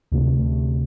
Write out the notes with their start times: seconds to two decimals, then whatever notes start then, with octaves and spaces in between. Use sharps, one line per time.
0.12 D2 C3 A3